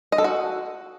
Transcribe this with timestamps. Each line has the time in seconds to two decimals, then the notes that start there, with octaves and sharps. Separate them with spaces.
0.12 D#5
0.18 A4
0.24 F#4